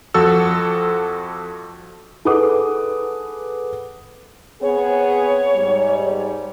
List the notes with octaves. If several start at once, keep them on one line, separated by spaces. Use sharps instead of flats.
F2 F3 F#4 A4 E6
G#4 A4 B4 F#5 D6 D#6
B3 C4 G#4 C#5
G#2 G3